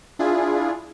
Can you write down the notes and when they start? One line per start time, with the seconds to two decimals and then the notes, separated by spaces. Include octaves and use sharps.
0.19 D4 E4 F4 G#4